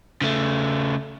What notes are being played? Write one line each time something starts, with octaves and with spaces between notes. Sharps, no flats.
C#3 A3